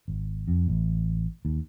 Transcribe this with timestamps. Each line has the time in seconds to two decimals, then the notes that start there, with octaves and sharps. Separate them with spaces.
0.08 G#1
0.48 F2
0.68 A1
1.45 D#2